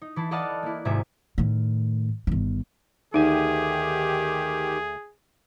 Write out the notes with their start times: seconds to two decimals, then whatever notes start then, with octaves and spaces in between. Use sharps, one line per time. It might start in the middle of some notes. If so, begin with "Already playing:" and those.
0.01 D#4
0.16 E3 E4 A5
0.31 A4 D5 D#5 F5 F#5 A5
0.63 A#3 E4
0.85 G#1 G#2 C3 E5 G#5
1.38 A2 D#3
2.27 G1 D#3
3.14 D2 D#3 D#4 G4 G#4 G#5